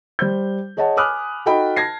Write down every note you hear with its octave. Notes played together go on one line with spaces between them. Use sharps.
G3 C5 G6
G#4 C#5 D#5 F#5 A5
G#5 B5 D6 D#6 F6 F#6
D#4 F#4 A4 D#5 G5 B5
A5 G#6 A#6 C7